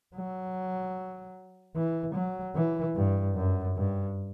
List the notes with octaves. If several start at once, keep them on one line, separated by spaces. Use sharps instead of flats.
F#3
E3
F#3
E3
G2
F#2
G2